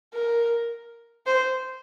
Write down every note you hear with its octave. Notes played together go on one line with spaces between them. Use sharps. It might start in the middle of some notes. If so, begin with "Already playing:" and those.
A#4
C5